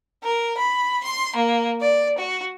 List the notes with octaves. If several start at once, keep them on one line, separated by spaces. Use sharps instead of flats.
A#4
B5
C6
A#3
D5
F#4